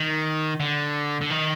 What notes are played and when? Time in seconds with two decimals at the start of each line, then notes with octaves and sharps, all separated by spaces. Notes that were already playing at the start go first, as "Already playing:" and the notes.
Already playing: D#3
0.60 D3
1.21 D3
1.30 D#3